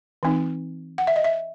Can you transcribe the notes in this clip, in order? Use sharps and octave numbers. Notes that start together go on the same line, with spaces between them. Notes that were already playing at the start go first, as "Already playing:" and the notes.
E3 C4 D#4
F#5
E5
D#5
E5